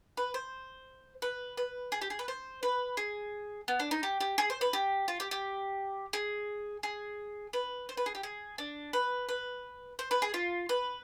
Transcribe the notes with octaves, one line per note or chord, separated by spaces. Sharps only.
B4
C5
B4
B4
G#4
G4
G#4
B4
C5
B4
G#4
B3
D4
D#4
G4
G4
G#4
C5
B4
G4
F4
G4
G4
G#4
G#4
B4
C5
B4
G#4
G4
G#4
D4
B4
B4
C5
B4
G#4
F4
B4